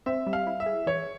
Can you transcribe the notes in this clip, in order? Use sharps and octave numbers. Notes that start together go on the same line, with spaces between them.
C4 E5
G3
F5
E4
E5
G#4
E3 C#5